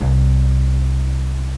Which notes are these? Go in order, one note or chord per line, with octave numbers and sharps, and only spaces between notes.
C2